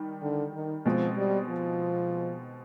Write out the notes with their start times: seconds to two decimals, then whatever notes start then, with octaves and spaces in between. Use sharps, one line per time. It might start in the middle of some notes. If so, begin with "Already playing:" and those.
Already playing: D#3 G3
0.22 D3
0.54 D#3
0.85 B2 F3 G#3 C4
1.16 G3
1.49 F3